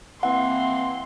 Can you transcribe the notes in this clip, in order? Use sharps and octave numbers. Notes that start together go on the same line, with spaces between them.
E3 A#3 C4 F#5 C6